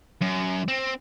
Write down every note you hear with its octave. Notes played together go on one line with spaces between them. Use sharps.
F#2
C4